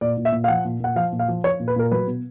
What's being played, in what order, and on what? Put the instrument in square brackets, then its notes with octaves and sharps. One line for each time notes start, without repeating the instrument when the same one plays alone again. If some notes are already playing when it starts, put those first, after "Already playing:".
[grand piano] A#2 D5
A#2
E5
A#2
F5
F3 F#5
A#2
A#2 F#5
F3 F5
A#2
F5
F3
F3 C#5
A#2
B4
A#2 A#4
F#3 B4
B2